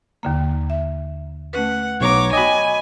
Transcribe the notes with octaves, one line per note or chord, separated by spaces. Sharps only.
D#2 D3 A#3
E5
A3 C#4 B4 F#5
B1 B3 C#5 A#5 D6
F#4 D#5 G5 G#5 B5 D6